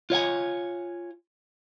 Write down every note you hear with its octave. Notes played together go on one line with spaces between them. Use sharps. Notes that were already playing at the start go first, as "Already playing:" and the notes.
F4 C#5 F#5 G#5